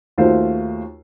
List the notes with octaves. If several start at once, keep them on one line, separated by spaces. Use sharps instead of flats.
D#2 A3 F4 F#4 C5